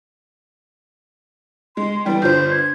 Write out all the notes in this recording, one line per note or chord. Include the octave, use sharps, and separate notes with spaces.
G#3 C6
E3 G3 B3 G5
G1 F4 C5 G6
G#6